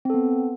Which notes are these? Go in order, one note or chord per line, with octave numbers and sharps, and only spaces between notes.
B3 C4 A4